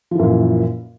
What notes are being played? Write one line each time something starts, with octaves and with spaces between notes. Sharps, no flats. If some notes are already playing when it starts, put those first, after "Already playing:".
F#2 A#2 E3 F3